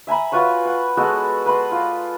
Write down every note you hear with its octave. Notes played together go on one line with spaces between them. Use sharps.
E5 G#5 A#5 B5
F4 F#4 B4 C#5
F#5
G#3 B3 F#4 A4
B4 B5 C6
F4 D5